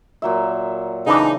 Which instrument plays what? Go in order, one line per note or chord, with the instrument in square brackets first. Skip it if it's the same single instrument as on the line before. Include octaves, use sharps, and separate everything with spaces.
[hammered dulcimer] A#2 F#3 E5
[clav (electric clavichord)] C#3 E3 D4 [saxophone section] D#4